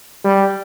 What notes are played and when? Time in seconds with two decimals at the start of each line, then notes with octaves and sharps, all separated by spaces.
0.25 G3